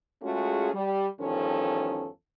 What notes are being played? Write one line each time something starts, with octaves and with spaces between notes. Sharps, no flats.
G#3 A3 C#4 F4 F#4 G#4
G3
E2 G2 D#3 F3 C#4 A4